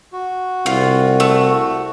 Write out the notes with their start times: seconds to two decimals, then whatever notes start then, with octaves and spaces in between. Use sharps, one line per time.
0.13 F#4
0.66 C2 F4
1.20 A3